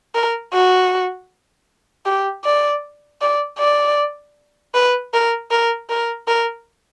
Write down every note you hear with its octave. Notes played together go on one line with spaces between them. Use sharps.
A#4
F#4
G4
D5
D5
D5
B4
A#4
A#4
A#4
A#4